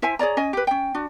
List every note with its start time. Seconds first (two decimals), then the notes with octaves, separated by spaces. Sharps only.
0.02 E4 C5 E5 G#5
0.19 G#4 C#5 D5 A#5
0.37 C#4 D#5 G#5
0.53 G4 B4
0.67 C#4 G5
0.95 D4 F#4